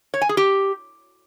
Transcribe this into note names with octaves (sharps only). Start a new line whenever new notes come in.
C#5
G#5
G#4
G4